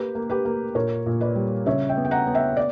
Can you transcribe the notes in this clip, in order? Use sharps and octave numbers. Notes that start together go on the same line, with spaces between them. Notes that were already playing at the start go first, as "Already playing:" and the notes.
Already playing: A#3 G4 B4
A#3
G4 B4
A#3
A#2 A#4 C#5
A#2
B4 D5
G3
C#3 C#5 E5
E5 G5
B3
G5
F#5 A#5
B3
E5 G5
D5